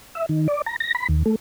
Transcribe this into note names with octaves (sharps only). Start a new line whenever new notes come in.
E5
D#3
D5
A#5
A#6
B5
D#2
A3